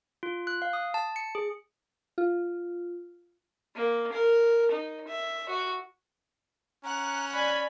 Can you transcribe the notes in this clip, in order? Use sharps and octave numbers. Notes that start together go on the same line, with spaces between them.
F4
F#6
F5
D#6
A5
C#7
G#4
F4
A#3
A#4
D#4
E5
F#4
C#4 F#5 A#5 F#6
D5 G#5 B5